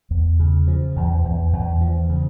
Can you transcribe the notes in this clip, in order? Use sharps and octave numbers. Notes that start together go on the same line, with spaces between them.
E2
C#3
F3
E2
E2
E2
F3
C#3